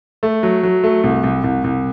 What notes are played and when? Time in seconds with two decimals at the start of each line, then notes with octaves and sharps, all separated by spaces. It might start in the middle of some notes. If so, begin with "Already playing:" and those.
0.23 A3
0.43 F#3
0.63 F#3
0.84 A3
1.04 C2
1.24 C2
1.44 C2
1.64 C2